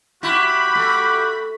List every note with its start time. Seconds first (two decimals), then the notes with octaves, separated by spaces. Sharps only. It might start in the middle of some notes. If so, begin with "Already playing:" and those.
0.23 E4 F#4 G4 B5
0.75 A3